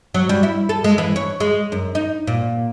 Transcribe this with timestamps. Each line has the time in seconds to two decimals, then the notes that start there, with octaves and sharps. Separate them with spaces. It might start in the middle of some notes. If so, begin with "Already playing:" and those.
0.14 F#3
0.29 G3
0.43 E4
0.69 A4
0.84 G#3
0.98 E3
1.16 C#5
1.40 G#3
1.72 F#2
1.95 D#4
2.27 A#2